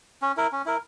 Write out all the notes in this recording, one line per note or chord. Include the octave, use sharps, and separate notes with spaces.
C#4
E4 A#4
C#4
E4 A#4